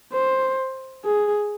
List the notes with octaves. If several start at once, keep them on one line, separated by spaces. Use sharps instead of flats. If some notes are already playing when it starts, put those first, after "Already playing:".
C5
G#4